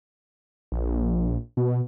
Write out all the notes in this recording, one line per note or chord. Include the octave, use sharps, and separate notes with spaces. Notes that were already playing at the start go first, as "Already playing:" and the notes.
A#1
B2